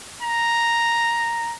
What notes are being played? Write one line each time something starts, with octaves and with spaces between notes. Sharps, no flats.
A#5